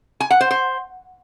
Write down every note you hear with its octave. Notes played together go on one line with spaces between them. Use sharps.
G#5
F#5
C5
C5